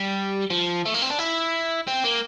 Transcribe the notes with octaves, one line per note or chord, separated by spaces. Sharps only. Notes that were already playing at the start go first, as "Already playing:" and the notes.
Already playing: G3
F3
A3
A#3
C4
D4
E4
C4
A#3